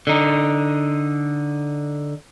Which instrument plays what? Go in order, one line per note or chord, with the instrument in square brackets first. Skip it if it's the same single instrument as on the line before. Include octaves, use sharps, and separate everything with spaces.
[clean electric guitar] D3 D#4